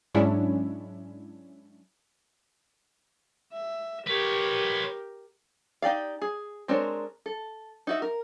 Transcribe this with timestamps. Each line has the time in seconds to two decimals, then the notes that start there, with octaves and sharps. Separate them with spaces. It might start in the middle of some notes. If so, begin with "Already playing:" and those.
0.14 G#2 F#3 G#3 C#4 D4 E4
3.52 E5
4.07 G4 A#4 B4 C#5
5.82 D#4 G4 D5 F5
6.22 G#4
6.68 G#3 C4 D4 A#4 C#5
7.26 A4
7.87 D#4 F#4 E5
8.02 A#4